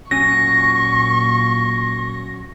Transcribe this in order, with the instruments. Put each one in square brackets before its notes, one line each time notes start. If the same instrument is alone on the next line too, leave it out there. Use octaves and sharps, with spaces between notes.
[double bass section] A#2 [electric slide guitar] F#3 C#4 G#5 [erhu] C#6 [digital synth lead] A#6